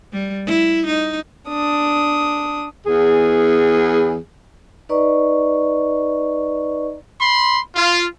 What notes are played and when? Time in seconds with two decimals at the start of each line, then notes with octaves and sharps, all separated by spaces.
0.13 G3
0.46 E4
0.86 D#4
1.49 D4 D#6
2.86 E2 G#4
4.89 D#4 B4 D5 D#5 A#5 C#6
7.21 B5 C6
7.76 F4